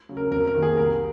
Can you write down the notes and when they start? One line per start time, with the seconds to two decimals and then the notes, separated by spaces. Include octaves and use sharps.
0.09 C#3 F#3
0.17 A#4
0.31 F2 A#4
0.47 A#4
0.55 D#3 A#3
0.62 G#4
0.77 C2 A#4